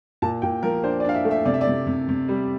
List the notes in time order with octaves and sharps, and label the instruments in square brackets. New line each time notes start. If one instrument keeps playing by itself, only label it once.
[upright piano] A#2 A5
A#2 G5
F3 A#4
D4 C5
D5
D4 F5
E5
A3
E5
C3 D5
E5
D5
C3
C3
C3
G3